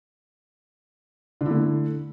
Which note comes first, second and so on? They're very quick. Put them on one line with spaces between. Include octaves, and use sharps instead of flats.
D3 E4 A3